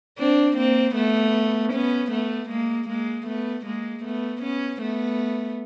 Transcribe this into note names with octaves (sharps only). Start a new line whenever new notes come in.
C4 D4
A#3 C4
A3 B3
B3 C#4
A3 B3
G#3 A#3
G#3 A#3
A3 B3
G#3 A#3
A3 B3
B3 C#4
A3 B3